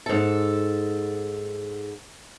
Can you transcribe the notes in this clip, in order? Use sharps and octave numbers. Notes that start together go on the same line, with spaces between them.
G#2 A4